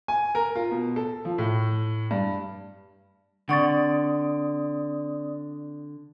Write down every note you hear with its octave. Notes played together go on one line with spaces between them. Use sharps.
G#5
A#4
F4
B2
A4
F3
A2
G2
D3 C4 D5 F#5 C#6 D#6 A6